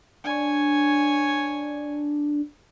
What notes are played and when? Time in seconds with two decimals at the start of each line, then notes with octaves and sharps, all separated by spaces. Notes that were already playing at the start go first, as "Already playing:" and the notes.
0.24 D4 C#5 G#5